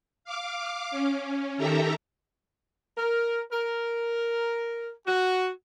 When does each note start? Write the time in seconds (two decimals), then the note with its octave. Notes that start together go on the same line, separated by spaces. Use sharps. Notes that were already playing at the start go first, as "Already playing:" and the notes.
0.24 F5 D6
0.91 C#4
1.57 D#3 G4 A4 E5 A#5
2.97 A#4
3.52 A#4
5.07 F#4